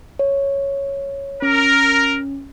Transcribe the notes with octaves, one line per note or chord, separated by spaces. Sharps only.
C#5
C#4 A#4